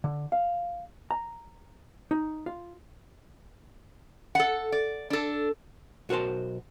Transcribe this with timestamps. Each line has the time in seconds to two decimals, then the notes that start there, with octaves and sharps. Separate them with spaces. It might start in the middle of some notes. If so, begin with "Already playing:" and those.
0.04 D3
0.32 F5
1.11 A#5
2.11 D#4
2.46 F4
4.35 A4 F#5
4.72 D5
5.10 D4 A4
6.09 B1 F#4 A#4 C5 A5